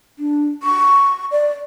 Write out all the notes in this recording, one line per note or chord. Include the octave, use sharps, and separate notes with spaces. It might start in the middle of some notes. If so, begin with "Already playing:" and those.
D4
C#6
D5